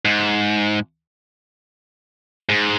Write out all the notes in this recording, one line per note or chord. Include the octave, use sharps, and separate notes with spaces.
G#2
G#2